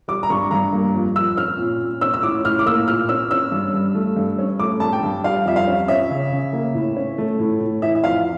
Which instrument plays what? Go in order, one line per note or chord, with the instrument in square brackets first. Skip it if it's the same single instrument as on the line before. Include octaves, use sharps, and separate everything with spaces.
[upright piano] G3 D6
A#5
G2 C#6
G2 A#5
A#3
F2
F2 E6
C#4 F6
A#2
A#2
C#4 E6
E6
A2 D6
A2 F6
D6
A#3 E6
A#2 F6
C#4 E6
C#4 E6
G2
G2
A3
G2
C#4
A3 D6
G2 A5
G5
G2
G3 F5
F2 E5
F5
C#4
C#4 E5
C#3
C#3
A#3
A2
C#4
A3
A2
A2
E3 E5
E5
F2 F5